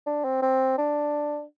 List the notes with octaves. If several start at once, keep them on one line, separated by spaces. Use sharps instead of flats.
D4
C4
C4
D4